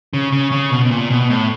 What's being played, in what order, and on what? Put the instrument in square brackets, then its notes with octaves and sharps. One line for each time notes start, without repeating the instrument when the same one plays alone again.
[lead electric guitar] C#3
C#3
C#3
B2
B2
A#2
B2
A2